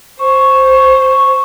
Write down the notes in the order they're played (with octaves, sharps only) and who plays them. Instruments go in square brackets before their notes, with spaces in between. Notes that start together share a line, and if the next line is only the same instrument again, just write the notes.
[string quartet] C5 [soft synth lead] C#6